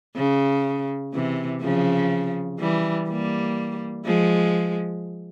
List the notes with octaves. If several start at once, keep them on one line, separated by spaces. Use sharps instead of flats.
C#3
C3 E3
C#3 F3
E3 G3
G3 A#3
F3 G#3